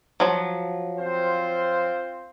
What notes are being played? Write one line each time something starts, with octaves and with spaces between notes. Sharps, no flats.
F3 F#3
C4 F4 C5